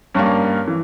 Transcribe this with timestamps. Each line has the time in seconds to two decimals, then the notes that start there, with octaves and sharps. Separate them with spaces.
0.14 G2 G3 A#3 C#4
0.68 E3